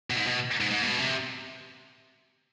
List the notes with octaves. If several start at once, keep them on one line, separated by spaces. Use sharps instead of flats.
B2
G#2
B2
G#2
G#2
B2
C3